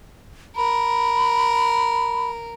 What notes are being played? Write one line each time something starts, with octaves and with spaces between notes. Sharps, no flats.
A#4 B5